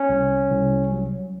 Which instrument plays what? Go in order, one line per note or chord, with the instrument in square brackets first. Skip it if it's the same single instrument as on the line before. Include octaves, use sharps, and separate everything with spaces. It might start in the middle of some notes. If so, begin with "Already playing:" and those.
Already playing: [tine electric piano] C#4
C2
C2
F#3